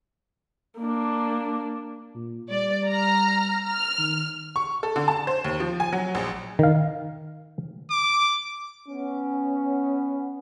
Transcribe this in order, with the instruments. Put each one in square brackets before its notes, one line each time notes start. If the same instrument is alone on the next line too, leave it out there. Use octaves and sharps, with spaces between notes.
[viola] A#3 D4
[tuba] A#2
[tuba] G3 [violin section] D5
[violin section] A#5 F6
F6
[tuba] D#3
[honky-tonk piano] C#6
A4
D3
A5
C5
D#2
F3
G#5
F#3
A#1
[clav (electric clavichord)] D#3 F5
[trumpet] D6
[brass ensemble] B3 C#4